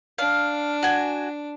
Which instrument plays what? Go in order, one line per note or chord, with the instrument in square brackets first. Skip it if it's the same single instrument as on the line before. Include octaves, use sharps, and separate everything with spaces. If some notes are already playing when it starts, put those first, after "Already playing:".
[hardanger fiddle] D4 [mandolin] F5
[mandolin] F#4 G#5